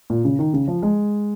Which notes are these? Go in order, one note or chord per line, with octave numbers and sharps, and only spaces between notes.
A#2
C#3
D#3
C#3
F3
G#3